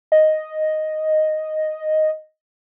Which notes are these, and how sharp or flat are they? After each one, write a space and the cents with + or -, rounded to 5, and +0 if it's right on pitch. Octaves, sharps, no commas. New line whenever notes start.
D#5 +0